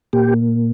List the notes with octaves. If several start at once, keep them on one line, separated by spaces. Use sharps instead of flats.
A#2 G4